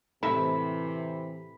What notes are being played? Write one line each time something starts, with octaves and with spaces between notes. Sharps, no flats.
A2 C3 E3 E5 B5